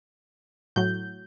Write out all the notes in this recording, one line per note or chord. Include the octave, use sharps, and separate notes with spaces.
A2 F#3 G6